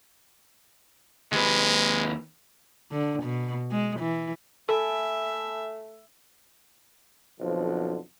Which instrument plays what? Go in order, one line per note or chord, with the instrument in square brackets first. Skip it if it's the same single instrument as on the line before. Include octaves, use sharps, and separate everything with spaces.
[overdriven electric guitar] D#2 B4 [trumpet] G#3
[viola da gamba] D3
B2
G#3
E3
[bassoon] A3 [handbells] A4 [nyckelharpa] E5 [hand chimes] G#5 A5 B5
[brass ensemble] B1 F2 D3 F3